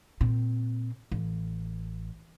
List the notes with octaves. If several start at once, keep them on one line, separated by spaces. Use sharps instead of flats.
A#2 C4
A1